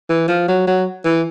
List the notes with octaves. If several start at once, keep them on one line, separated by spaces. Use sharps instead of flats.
E3
F3
F#3
F#3
E3